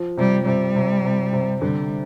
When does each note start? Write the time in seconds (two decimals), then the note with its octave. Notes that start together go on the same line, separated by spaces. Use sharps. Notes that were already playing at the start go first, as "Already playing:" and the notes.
Already playing: F3
0.17 C3 G3
0.46 C3 G3
0.75 C3
1.04 C3
1.33 C3
1.61 D3 G3